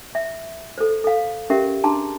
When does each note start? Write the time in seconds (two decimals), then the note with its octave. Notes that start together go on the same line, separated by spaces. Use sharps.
0.15 E5
0.78 A4 C5
1.04 A4 F5
1.50 C#4 G4 A#4 E5
1.84 D4 G#4 A5 A#5 C6